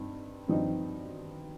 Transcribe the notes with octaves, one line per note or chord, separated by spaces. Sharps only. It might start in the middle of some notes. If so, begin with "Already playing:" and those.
Already playing: G2 C4 D#4
G2 F3 C4 D#4